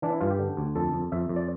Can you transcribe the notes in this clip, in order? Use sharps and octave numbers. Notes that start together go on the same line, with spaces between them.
E3 D4
E4
G2 F4
G4
D3
D2
F2 A4
F2
F2 E5
F2
D5